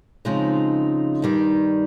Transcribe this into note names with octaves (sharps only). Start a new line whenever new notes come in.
C#3 F3 G#3 C4 D#4
G2 D#3 G3